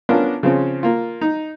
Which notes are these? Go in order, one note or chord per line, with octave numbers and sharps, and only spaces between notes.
B3 C#4 D4 F4 A#4
C#3 F3 C4 C#4
A#3 F4
D#4